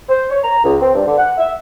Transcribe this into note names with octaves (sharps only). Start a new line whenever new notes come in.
C5
C#5
A#5
C#2
C4
G2
D3
F#5
E5